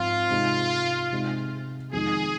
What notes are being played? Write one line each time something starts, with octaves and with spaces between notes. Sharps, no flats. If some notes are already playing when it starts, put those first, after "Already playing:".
Already playing: G#2 F3 C4 F4
C3 G#3 D#4
C3 G#3 D#4
F2 D#3 G#3 D#4 G#4